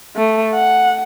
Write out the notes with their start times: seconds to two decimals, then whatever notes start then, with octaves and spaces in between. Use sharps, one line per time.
0.16 A3
0.55 F#5